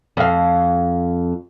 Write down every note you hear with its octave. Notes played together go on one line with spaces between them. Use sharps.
F2 F5